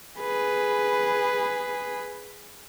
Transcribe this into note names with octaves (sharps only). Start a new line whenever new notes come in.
G#4 B4